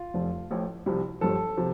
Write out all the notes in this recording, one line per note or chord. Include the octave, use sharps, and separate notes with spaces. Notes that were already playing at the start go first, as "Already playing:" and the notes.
Already playing: F4
F1 F2 F3
A1 A2 F3
C2 C3 F3
G1 G2 F3 A4
C3 F3